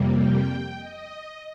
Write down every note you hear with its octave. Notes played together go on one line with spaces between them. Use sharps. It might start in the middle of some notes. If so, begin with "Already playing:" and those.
Already playing: F2 C3 G3 A#3
G5
D#5